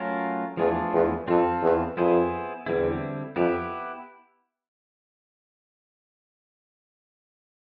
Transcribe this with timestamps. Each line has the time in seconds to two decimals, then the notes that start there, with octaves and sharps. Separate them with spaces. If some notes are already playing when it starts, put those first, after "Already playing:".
Already playing: F#3 A3 C#4 F4 A#4
0.57 E2 F3 A3 D4 F4 G#4
0.93 E2
1.28 F2 C4 F4 A4
1.62 E2
1.97 F2 B3 E4 G#4 C5
2.66 E2 D3 G3 C4 E4
3.36 F2 B3 E4 G4 B4